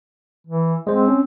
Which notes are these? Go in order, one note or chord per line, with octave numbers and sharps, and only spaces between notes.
E3
G#3 C4 C5
C#4